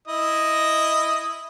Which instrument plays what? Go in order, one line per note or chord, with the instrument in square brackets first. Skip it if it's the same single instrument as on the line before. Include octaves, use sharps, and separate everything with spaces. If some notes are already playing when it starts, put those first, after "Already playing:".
[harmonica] E4 D#5